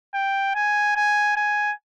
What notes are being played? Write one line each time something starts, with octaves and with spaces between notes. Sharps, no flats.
G5
G#5
G#5
G#5